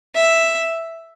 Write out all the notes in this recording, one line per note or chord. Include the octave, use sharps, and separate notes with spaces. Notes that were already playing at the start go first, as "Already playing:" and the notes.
E5